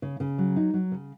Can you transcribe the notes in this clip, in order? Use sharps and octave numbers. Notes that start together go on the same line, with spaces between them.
C#3
C#3
F#3
D#4
F#3
C#3